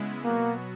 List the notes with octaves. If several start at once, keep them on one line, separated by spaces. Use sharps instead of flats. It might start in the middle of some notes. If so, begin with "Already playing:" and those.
Already playing: C#3 G#3 B3 E4
B2 F#3 A#3 B3 F#4